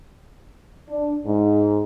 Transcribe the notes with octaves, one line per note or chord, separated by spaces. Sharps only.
D4
G#2